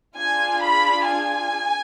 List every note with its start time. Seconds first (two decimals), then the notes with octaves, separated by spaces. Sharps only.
0.16 D4 F4 G#4 G#5
0.62 B5
1.06 G#5